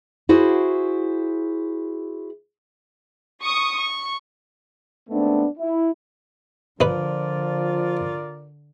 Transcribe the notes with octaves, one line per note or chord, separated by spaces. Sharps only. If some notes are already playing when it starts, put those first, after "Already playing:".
E4 F#4 G#4 C5
C#6 D#6 C#7
C#6
G#2 A3 B3 C4 D4
E4
D3 F3 D#4 F4 A#4 B4 D5